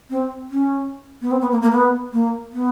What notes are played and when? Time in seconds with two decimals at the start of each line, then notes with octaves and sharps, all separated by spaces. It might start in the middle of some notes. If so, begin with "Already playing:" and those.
0.10 C4
0.50 C#4
1.21 B3
1.31 C4
1.41 B3
1.52 A#3
1.62 A#3
1.72 B3
2.13 A#3
2.53 B3